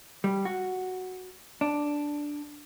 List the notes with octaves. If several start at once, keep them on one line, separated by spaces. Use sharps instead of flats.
G3
F#4
D4